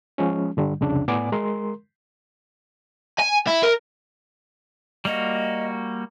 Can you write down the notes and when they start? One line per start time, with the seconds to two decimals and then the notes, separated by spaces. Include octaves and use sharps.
0.18 F3 G#3 C#4
0.57 G2 D3 G3
0.81 C2 F2 C#3 D4
1.08 A2 B3 D5 G#5 D6
1.32 G#3 A#4 C6
3.19 G#5
3.47 E4
3.63 A#4
5.05 G3 A#3 F#4 D#5